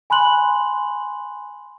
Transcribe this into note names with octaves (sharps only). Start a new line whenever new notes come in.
G#5 B5 C6 F#6 F#7